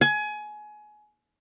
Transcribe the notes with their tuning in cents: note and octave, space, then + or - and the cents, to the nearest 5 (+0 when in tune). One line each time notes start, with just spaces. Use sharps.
G#5 +25